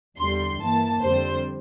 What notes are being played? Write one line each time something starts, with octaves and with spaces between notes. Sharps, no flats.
E2 D3 G3 C6
G2 E3 A#3 A5
F2 D3 G3 C4 C5